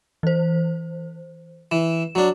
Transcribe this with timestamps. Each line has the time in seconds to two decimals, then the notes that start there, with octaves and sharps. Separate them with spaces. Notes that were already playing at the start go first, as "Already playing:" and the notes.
0.23 E3 C5
1.72 E3 E7
2.15 F#3 D4